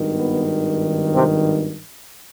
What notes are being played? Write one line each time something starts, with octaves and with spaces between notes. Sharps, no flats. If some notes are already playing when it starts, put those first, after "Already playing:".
Already playing: G#1 G2 D#3
B3
C3 C4